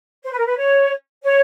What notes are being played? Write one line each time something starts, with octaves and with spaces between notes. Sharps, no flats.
C5
B4
A#4
B4
C#5
C#5